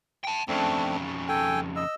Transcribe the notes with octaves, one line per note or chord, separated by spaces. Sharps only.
G5 A5
F2 C#3 A3 C4 D4
A4 G5 G#5
D#5 E6